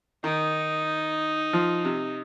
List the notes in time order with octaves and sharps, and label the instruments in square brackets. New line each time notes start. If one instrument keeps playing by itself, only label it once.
[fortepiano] D#3 [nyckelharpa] D#4
[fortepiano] F3
C3